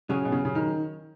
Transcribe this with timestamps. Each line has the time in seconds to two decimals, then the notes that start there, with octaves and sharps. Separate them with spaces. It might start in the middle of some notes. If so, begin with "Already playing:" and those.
0.09 C#3 F#3 C#4 G#4
0.25 B2
0.32 C#3
0.45 C#3
0.55 D#3